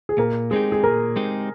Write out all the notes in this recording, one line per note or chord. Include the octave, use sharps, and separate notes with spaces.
G#4
A#2 A#4
G#3 C4 D#4 G4 G#4
G#4
A#2 A#4
G#3 C4 D#4 G4